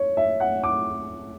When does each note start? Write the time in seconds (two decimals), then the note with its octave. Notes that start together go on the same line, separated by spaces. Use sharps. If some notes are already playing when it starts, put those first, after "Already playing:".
Already playing: C#5
0.17 E5
0.40 F#5
0.63 D6